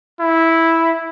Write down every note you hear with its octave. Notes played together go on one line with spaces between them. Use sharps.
E4